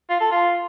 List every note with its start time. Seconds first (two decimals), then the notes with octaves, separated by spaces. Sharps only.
0.10 F4
0.21 A4
0.31 F4